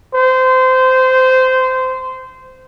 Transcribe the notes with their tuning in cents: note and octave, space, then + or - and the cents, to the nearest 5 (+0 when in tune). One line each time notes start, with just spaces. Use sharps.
C5 -20